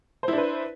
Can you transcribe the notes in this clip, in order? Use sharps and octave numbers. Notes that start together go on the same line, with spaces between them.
D4 E4 B4 C5